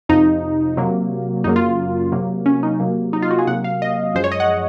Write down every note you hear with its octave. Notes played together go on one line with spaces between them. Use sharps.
F2 C3 F3 D#4
C3 F#3 A#3
F#2 C#3 F#3 A#3 D#4
F4
C3 F#3 A#3
C#4
D#4
C3 F#3 A#3
D#4
F4
F#4
G#4
C3 F#3 A#3 F#5
F5
D#5
F#2 F3 G#3 C5
C#5
D#5
F#5